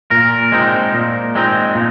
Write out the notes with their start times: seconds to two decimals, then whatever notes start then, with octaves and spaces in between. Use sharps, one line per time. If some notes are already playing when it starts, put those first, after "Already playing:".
0.11 A#2 A#4
0.52 G#3 C4 D#4
0.94 A#2
1.35 G#3 C4 D#4
1.75 A#2